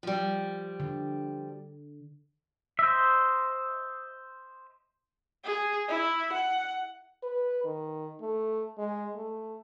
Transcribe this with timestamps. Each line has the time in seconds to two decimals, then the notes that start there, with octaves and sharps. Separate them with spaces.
0.03 F3 G3
0.80 D3
2.79 C5 D#5 E5
5.44 G#4
5.88 E4
6.33 F#5
7.23 B4
7.65 D#3
8.21 A3
8.78 G#3
9.16 A3